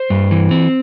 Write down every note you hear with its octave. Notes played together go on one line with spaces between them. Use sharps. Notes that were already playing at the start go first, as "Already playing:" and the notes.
Already playing: C5
G2
E3
C4